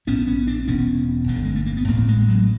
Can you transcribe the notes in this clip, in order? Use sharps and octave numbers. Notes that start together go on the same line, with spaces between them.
A#1 G#2 B3 C#4
B3 C#4
C4 D4
E1 E2 B2 B3 C#4
G1 G2 D3
G#3
A3
A#3
B3
A1 A2 A#3 C4
G#3 A#3
F#3 G#3